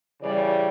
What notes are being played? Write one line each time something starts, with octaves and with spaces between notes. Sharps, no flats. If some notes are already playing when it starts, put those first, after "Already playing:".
C#3 E3 G3 D5